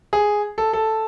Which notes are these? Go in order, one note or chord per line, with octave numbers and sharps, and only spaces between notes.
G#4
A4
A4